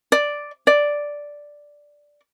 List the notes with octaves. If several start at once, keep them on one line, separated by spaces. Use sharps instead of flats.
D5
D5